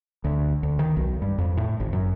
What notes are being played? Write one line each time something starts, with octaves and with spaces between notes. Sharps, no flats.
D2
D2
D#3
B1
G2
F2
A2
G#1
F#2